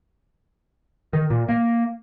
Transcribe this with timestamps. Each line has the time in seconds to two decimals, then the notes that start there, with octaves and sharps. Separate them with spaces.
1.13 D#3
1.30 A#2
1.49 A#3